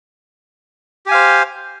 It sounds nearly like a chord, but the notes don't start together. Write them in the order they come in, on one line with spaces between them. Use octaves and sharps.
G4 G#5 F5 C5